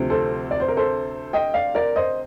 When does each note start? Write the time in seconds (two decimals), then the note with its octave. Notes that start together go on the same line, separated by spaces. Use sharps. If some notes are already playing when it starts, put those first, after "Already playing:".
Already playing: D2 C3 F3 C4
0.10 A4 C5
0.51 D5
0.60 C5
0.68 A#4
0.77 A4 C5
1.33 D#5 G5
1.54 D5 F5
1.75 A#4 D5
1.96 C5 D#5